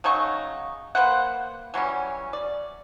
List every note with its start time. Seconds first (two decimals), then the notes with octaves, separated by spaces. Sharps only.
0.04 C#3 F#3 D#4 C#6
0.95 A#3 B4 C5 F#5
1.74 E3 F#3 G3 C#4
2.33 D5